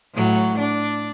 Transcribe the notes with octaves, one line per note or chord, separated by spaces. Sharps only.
A2 F#3
D4